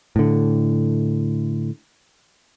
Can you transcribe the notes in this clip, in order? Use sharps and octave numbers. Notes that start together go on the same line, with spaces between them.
A2 D3